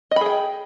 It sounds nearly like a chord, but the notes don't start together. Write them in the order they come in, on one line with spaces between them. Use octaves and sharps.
D#5 B5 G#4 G5